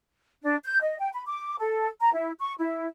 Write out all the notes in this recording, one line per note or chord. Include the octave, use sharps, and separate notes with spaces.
D4
G6
D#5
G5
B5
D6
A4
A#5
E4
C#6
E4